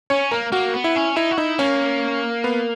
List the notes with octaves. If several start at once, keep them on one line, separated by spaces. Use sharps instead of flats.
C#4 C#5
A#3 A#4
A#3 F#4
B3
E4
C#4
D#4 E4
F#4
D#4 E4
A#3 C#4
B3